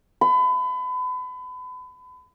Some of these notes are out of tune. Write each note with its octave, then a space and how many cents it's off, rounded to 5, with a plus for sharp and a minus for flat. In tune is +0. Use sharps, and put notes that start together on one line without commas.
B5 +35